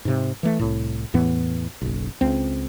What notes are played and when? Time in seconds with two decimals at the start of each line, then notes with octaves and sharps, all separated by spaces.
0.05 G#2 C3
0.43 E3 A3
0.59 C2 A2
1.14 E2 A2 E3 B3
1.82 F#1 B1
2.21 C#2 C4